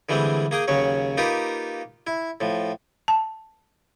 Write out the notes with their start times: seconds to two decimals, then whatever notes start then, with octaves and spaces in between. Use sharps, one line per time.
0.09 D3 E3 G3 G#3 C4
0.51 A#3 G#4 G5 D#6
0.68 D#2 C#3 F#3 C#5
1.17 A#3 D#4 F4 G4 A#4 B4
2.07 E4
2.41 A2 F3
3.08 A5